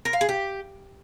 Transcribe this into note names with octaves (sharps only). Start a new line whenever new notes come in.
A#4
F5
G#4
G4